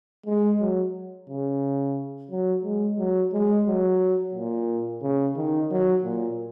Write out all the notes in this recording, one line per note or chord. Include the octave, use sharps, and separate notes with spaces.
G#3
F#3
C#3
F#3
G#3
F#3
G#3
F#3
A#2
C#3
D#3
F#3
A#2